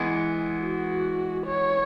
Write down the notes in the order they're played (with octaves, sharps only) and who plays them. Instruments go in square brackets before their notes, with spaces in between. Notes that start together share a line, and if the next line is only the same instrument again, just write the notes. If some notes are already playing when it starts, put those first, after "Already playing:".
Already playing: [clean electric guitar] E3 G#3 B3
[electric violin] F#4
C#5